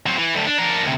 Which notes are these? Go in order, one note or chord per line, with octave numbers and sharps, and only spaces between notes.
F#3 C4
E3
D2 A2
D4
D4 A#4
D2 C3